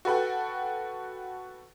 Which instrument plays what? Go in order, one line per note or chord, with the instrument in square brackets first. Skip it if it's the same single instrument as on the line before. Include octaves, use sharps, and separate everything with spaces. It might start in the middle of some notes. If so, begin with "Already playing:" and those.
[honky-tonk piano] F#4 A4 B4 F#5 G5